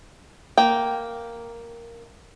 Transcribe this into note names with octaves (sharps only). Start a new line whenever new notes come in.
A#3 G5